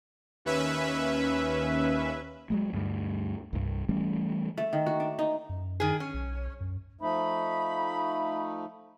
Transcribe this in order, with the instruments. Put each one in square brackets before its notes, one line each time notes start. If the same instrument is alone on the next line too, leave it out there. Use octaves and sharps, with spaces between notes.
[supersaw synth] D#2 C#4 B4 E5
[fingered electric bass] F#3 G#3 A3
D2 G2 G3
C2 G2
E3 G3 A3 C#4
[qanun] A3
D#3
F#4
D4
D#4
[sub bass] F#2
[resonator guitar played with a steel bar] D#3 G#4
C#4
[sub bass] B1
F#2
[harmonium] F3 A3 D#4 [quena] B5